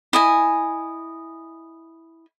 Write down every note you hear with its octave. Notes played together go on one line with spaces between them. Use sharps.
E4 D#5 G#5